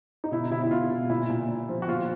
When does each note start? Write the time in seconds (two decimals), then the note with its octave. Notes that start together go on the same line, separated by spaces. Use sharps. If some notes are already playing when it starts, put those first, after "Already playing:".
0.24 D#4
0.32 B2 E4
0.51 B2 E4
0.62 E4
0.71 B2 F4
0.91 B2
1.10 A#2 E4
1.30 A#2
1.49 A#2
1.69 F3
1.82 F#4
1.88 A#2 F4